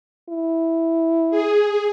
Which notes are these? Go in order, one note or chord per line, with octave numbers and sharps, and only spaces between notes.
E4
G#4